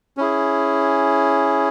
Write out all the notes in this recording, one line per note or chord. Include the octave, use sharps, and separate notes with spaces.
C#4 E4 G#4